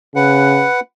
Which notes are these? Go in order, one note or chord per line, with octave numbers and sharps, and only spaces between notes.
C#3 B4 F#5